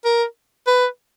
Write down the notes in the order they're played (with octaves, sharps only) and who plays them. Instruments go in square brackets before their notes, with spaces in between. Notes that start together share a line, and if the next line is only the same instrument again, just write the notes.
[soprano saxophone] A#4
B4